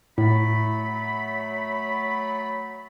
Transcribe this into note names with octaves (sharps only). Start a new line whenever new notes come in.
A2 F#3 A3 B5